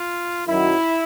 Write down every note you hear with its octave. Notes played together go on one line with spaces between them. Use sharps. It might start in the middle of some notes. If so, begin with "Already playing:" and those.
Already playing: F4
F#2 D#3 F#3 E4